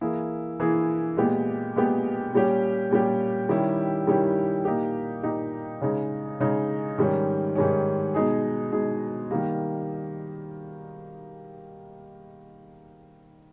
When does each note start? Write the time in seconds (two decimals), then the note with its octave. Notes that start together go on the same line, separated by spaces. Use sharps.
0.01 E3 A#3 E4 G#4
0.60 E3 A#3 E4 G#4
1.17 A#2 G#3 B3 G4
1.76 A#2 G#3 B3 G4
2.33 A#2 G3 C#4 G4
2.91 A#2 G3 C#4 G4
3.49 D#3 G3 C#4 E4 G4
4.07 D#3 G3 C#4 E4 G4
4.65 A#2 A#3 D#4 G4
5.23 A#2 A#3 D#4 G4
5.81 C#3 G#3 D#4
6.40 C#3 G#3 D#4
6.98 G#2 D#3 G3 C#4
7.55 G#2 D#3 G3 C#4
8.14 B2 G#3 D#4 G#4
8.72 B2 G#3 D#4 G#4
9.31 D#3 G3 A#3